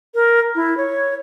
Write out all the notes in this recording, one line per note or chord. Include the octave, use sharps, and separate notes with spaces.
A#4
E4
C#5